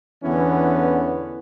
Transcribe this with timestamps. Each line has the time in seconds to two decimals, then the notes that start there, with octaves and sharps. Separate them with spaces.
0.23 E2 D3 E3 B3 C#4